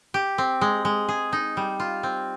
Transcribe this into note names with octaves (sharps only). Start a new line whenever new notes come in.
G4
C4
G#3
G#3
G#4
D#4
G3
F4
C4